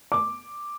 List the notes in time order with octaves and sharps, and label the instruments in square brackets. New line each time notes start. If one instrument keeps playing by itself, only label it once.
[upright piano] D6